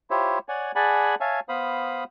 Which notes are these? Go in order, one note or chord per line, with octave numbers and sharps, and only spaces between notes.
E4 F4 G4 C5 C#5 E5
C#5 D5 F#5 G#5
G#4 D5 F#5 G#5 A5 B5
C#5 E5 F5 G#5 A5
B3 C5 F5 B5 D#6